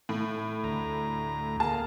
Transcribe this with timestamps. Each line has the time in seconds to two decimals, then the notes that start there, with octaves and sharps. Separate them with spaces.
0.09 A2
0.64 D2 A#5
1.60 A#3 G#4 F5 A5